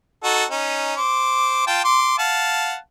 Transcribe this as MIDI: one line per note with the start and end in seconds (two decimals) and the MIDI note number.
0.24 0.44 63
0.24 0.44 66
0.24 0.44 69
0.51 0.95 61
0.51 0.95 63
0.97 1.66 72
0.97 1.66 86
1.67 1.81 65
1.67 1.81 79
1.67 1.81 81
1.85 2.16 84
1.85 2.16 86
2.19 2.76 77
2.19 2.76 78
2.19 2.76 81